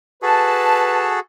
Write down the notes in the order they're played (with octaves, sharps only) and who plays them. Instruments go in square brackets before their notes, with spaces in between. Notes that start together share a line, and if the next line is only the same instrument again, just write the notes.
[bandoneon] F#4 G#4 A4 [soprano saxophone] B4 [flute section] A5